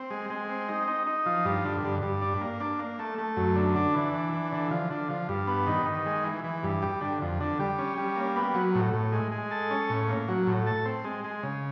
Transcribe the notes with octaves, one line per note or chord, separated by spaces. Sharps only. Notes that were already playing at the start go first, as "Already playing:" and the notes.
Already playing: C4
G#3
G#3
C4
D#4
D#4
D#4
F3
G2
D3
G2
G2
D4
A#3
D4
A#3
A3
A3
F#2
D3
D4
E3
D4
E3
D3
F3
D3
F3
G2
B3
D#3
D#3
G#3
E3
E3
G2
G3
D3
F2
D3
G3
C#4
G3
A#3
B3
F#3
A2
A2
G#3
G#3
A4
C#4
A2
A#3
F#3
A2
A4
C4
G#3
G#3
C#3